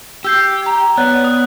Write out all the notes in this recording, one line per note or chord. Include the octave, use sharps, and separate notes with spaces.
G4 E6 G6 C7
A#5 G#6
B3 C#5 D5 F#5 F#6
D#6